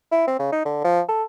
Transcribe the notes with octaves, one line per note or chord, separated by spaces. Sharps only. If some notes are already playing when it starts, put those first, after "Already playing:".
E4
C4
C#3
D#4
D3
F3
A4